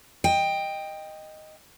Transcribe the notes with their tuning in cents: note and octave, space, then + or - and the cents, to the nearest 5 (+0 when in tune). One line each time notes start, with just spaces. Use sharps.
D#5 +0 G5 +10